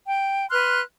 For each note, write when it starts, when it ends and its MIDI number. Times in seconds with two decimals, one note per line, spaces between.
0.07 0.48 79
0.50 0.80 71
0.50 0.80 84
0.50 0.80 89
0.50 0.80 90